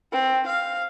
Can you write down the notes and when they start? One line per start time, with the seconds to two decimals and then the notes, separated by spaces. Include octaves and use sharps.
0.12 C4
0.46 F5